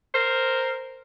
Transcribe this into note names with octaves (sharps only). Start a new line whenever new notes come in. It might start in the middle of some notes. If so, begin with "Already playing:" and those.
A#4 C5